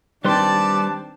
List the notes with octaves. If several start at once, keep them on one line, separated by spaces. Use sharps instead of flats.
D#3 G3 C4 D4 B4 D5 A5 C6